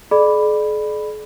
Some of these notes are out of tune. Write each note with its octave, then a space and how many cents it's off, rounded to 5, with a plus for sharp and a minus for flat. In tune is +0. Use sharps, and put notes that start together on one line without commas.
G#4 +45 D5 +25 B5 +0